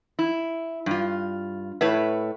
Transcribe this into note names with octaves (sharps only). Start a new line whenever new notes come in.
E4
G2 F4
A2 B4 C#5 E5